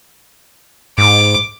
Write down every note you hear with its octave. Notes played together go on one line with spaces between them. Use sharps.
G#2 D6